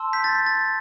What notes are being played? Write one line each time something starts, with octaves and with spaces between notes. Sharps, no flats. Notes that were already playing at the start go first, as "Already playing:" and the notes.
Already playing: A5 C6 E6
G6 B6
A6
A6